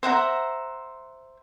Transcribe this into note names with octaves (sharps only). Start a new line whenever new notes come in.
C5 E5 F#5 A#5